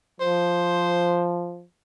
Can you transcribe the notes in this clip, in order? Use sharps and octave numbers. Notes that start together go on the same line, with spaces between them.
F3 C5